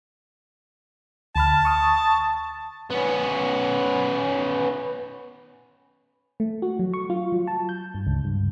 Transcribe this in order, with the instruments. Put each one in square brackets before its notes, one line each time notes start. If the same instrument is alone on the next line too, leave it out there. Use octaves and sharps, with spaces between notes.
[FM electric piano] D2 B5 F6 [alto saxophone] A5
[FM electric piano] C#6 D#6
[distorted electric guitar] B3 C#4
[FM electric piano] A3
F#4
F#3
C#6
F4
F#3
A5
G6
G2
C#2
G2